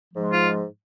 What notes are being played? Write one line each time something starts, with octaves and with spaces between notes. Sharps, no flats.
G#2 F3 G#3
F4